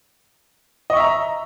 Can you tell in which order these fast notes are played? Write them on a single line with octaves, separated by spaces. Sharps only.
D#5 C#6 E5 A#5